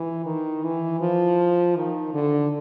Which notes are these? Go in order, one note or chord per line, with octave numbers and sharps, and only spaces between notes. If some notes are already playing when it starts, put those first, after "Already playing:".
Already playing: E3
D#3
E3
F3
D#3
D3